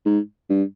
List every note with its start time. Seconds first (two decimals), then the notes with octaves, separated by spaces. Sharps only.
0.06 G#2
0.50 G2